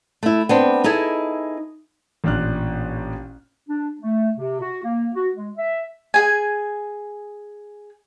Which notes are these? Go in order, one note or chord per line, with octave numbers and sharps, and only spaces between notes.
A3 E4
B3 C4 D4
D#4 E4 G#4 A4 D#5
A1 A#2 D4 F6 F#6
D4
A3
C3
F#4
A#3
F#4
G#3
E5
G#4 G#5